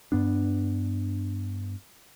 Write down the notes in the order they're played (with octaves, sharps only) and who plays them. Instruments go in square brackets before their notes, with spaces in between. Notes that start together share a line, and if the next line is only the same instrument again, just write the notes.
[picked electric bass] G2 B3 D4